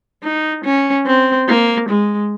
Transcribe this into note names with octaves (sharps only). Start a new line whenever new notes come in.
D#4
C#4
C4
A#3
G#3